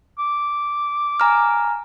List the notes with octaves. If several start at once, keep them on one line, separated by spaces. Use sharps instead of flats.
D6
G#5 A#5 F6